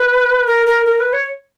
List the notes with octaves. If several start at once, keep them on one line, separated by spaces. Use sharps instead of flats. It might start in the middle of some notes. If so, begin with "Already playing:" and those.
Already playing: B4
A#4
A#4
A#4
B4
C#5